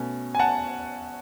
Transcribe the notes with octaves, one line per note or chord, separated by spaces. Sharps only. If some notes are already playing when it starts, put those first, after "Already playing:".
Already playing: B2 A3 C#4
G#5
F#5 A5